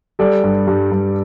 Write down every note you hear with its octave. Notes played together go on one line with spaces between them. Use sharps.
G3 A4 D5
G2
G2
G2